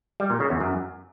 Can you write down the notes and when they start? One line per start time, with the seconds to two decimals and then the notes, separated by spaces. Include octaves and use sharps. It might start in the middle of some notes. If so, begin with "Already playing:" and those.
0.20 G3
0.30 A#2
0.40 C#3
0.50 E2
0.60 F#2